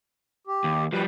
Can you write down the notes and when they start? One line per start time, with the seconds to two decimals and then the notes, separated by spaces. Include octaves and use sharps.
0.47 G4
0.64 D#2
0.93 D#3 F3 G3 B4